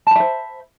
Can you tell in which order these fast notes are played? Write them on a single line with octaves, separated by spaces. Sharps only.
A5 B5 E5 C5